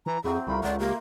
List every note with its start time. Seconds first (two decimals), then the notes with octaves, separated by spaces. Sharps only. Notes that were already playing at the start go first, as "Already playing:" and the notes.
0.06 E3 A#5
0.24 F2 F#3 C4 E4 G#4
0.47 C2 A3 F4 A#4 B5
0.63 C#2 D5 F#5
0.79 A#3 G4